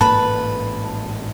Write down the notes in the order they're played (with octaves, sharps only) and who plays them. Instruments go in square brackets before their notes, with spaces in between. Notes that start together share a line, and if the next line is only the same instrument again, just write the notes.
[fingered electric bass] A1 G#2 A#3 [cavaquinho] B4 B5 [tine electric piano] A5